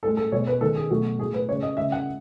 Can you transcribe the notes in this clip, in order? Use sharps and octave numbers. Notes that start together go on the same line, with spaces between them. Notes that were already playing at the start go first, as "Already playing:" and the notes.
A2 G#3 A4
A4
B2 G#3 C#5
B4
D#3 G#3 A4
G#4
B2 F#3 A3 F#4
A2 G#3 G#4
B4
C#3 G#3 C#5
D#5
C#3 G#3 E5
F#5